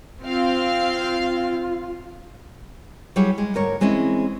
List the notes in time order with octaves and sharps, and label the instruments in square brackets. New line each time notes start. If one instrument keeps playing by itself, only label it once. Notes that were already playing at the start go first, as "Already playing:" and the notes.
[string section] C4 F5 [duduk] F4
[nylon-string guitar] F#3 G3 E4 G4 G#4 C#5
G#3
D2 G#2 A#4 C#5
E3 G#3 C4 C#4 E4